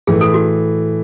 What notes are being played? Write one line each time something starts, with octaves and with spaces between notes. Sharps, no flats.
A2 E3 A3 G#4
A4
F#4